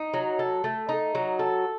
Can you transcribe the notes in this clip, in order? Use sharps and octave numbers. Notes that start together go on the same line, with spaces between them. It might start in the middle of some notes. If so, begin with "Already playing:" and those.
Already playing: D#4
F#3
A4
A3
D#4
F#3
A4